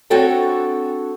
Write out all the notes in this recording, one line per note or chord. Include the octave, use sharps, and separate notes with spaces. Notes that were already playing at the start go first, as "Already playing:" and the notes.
C4 D4 F#4 A4 C#5 G5